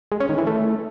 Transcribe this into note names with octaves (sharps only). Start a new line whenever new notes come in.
G#3
C#4
D#3
E3
A3